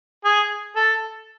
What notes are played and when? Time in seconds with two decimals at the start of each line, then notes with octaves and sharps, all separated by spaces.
0.25 G#4
0.76 A4